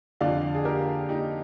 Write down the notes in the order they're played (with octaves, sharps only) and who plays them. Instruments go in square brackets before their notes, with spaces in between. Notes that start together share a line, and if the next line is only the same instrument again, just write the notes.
[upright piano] F2 D3 D5 F5
G#4
G4 A#4
D#4 G4